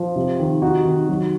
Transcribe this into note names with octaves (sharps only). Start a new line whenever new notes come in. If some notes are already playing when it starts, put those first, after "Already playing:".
Already playing: F3
C3
D#3
D#4 F#4
D#3
F#3